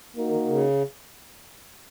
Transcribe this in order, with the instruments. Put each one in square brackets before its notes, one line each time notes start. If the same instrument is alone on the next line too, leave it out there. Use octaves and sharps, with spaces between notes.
[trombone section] A#3 D#4 F#4 A#4
[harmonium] D#3
C#3